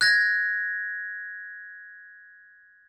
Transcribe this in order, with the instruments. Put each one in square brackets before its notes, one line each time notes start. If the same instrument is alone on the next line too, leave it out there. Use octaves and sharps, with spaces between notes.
[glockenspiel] F#6 G#6 A#6